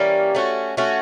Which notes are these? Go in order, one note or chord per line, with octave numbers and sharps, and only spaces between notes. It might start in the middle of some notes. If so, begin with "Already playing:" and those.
Already playing: E3 G3 A#3 C#4
A3 C#4 F#4
A3 C#4 F#4